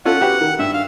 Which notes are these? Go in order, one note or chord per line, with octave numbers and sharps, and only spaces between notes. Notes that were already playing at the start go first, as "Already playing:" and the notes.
C#4 F4 A4 F#5
F#4 G4 B4
D#3
G2 E5
F5